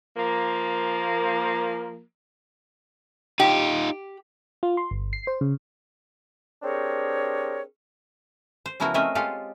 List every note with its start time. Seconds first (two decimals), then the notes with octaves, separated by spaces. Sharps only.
0.17 F3 A#3
3.40 D#4 F4 G4
4.63 F4
4.77 C6
4.91 G1
5.13 C7
5.27 C5
5.41 C#3
6.63 C4 D4 G4 G#4 A#4 C#5
8.66 C5
8.80 C#3 F3 B3 E4 F#4 A#4
8.94 A3 C4 C#4 A#4 D#5 E5
9.15 G#3 F4 G4 A4 F5